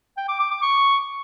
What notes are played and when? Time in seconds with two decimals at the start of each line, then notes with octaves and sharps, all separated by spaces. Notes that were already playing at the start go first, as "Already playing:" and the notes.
0.17 G5
0.28 D6
0.39 D6
0.51 D6
0.62 C#6